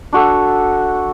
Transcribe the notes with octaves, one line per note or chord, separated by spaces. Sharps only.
D4 F#4 A4